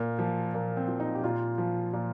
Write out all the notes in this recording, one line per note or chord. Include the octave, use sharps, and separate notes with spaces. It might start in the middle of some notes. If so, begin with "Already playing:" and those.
Already playing: A#2 A#3
F3
A#2 A#3
C4
F3
D#4
G4
A#2 F4
F3
A#2